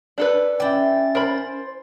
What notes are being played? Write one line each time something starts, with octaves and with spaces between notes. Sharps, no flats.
D4 A4 B4
C#4 E4 D5 G5 A6
A#4 C5 B5